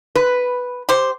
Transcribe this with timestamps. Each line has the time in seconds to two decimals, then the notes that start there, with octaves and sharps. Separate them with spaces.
0.15 B4
0.89 G4 C5